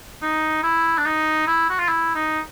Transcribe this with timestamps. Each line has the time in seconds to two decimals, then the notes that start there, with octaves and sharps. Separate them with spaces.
0.22 D#4
0.63 E4
0.98 D4
1.05 D#4
1.47 E4
1.70 F#4
1.79 F4
1.88 E4
2.15 D#4